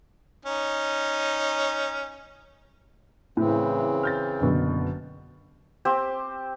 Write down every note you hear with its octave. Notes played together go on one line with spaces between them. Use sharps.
C#4 D#4
A2 C#3 E3 C4
F6 G6 A6
F#1 B2 D3
C4 G4 C5